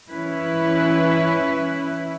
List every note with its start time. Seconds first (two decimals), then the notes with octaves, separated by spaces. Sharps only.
0.11 E3 C#4 E4 B4